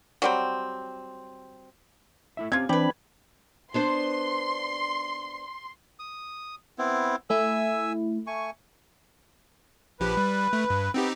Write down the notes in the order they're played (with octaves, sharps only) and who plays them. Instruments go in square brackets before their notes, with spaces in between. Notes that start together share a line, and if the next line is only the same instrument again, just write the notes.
[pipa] F#3 G3 C4
[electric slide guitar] A3 E4 E5
[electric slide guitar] C4 G4 [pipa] C#4 F4 [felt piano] G#6
[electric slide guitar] E3 [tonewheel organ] C4 D4 B5 [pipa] G4 B4
[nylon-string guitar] B3 D4 C5 [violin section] C6
[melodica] D#6
B3 C4 E4
[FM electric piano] A3 E4 [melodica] E5 G#5 E6
[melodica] A3 G#5 C#6
[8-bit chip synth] A#1 F3 G4 [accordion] B4
[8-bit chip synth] G3
A3
G2
[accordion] B3 [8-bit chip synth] C4 D#4 G4